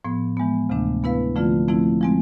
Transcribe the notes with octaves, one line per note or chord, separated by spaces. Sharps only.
A2 F3 B3
E3 G#3 B3
D2 C3 E3 A3 D4
G#3 B3 E4 B4 F5
D3 F3 A3 C4 F4
F3 A3 C4 E4
F3 G#3 C4